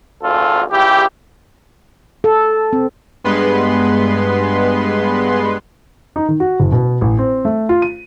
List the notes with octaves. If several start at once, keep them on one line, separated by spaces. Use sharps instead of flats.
G#1 D2 F4 A4
C#2 E4 G4
A4
C4
G2 G#3 B3 B4 C6
D#4
D#3
F#4
F#1
B2
A1
C4
A3
F4
D#7